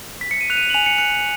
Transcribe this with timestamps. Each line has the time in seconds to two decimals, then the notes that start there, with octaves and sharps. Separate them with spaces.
0.21 B6
0.31 C#7
0.41 D#7
0.50 F#6 F7
0.57 D#7
0.62 F7
0.70 F#7
0.74 G#5 F7
0.86 C#7
0.98 F#6 C#7